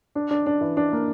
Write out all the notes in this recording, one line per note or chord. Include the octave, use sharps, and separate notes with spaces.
D4
D4
D4
E3
D4
A#3